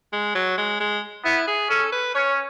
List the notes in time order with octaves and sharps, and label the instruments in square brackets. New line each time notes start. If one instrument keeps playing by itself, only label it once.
[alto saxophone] G#3
F#3
G#3
G#3
[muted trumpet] B3 [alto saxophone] E4
[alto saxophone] G#4
[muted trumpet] C#4 [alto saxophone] A4
[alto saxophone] B4
[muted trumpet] C#4 [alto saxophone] C#5